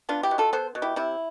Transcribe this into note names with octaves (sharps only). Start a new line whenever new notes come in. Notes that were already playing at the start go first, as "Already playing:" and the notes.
B3 D4 F4
E4 G4
B2
F4 A4
B3 A4 C5
B2
E4 G4
C3 E4